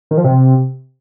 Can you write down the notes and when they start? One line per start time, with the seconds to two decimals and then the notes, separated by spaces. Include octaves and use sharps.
0.11 D#3
0.18 F3
0.24 C3